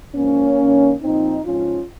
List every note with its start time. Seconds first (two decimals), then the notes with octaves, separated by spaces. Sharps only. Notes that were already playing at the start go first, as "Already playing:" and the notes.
0.15 G#2 F3 A#3 C#4
0.59 G2 D#3
1.02 A#2 F3 C4 D#4
1.45 G#2 F3 C#4 F4